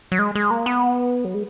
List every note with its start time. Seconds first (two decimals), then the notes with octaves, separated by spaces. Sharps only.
0.12 F#3
0.19 G#3
0.35 G#3
0.51 A#3
0.66 B3
1.25 F#3
1.34 G#3